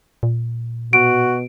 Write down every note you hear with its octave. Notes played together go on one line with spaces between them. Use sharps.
A#2
B2 F#4 D7